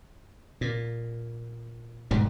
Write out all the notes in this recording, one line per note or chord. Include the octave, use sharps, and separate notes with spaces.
A#2
E1 G#2 G3